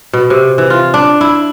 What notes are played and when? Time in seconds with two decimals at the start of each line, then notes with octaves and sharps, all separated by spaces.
0.13 B2
0.30 C3
0.58 E3
0.70 F4
0.94 D4
1.21 E4